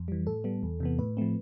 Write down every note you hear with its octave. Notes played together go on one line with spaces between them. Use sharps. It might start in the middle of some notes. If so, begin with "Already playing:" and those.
Already playing: F2
E3 G3
A2 A4
G3 B3
E2
C3 E3 B3
A2 B4
F3 A3 C4